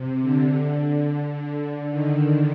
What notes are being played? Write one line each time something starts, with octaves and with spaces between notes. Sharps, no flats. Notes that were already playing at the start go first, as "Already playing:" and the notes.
Already playing: C3
D3
D3
D#3